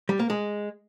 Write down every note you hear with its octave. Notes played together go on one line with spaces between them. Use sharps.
G3
A#3
G#3